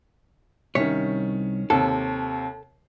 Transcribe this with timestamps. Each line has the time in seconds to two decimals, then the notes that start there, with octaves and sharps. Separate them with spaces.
0.75 C2 D#3 C#4 C#5 B6
1.70 D#2 C3 A4